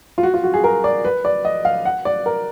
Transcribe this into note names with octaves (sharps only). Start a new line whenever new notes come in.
F4
F#4
F4
F#4
G#4
A#4
D5
B4
D5
D#5
F5
F#5
D5
A#4